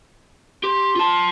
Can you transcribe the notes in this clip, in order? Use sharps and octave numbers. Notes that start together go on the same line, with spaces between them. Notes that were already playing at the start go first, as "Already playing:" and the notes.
G4 C6
F4 A5